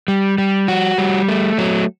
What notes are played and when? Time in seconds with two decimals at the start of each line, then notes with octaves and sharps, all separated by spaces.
0.08 G3
0.38 G3
0.68 F#4
0.98 G3
1.29 A3
1.58 F#3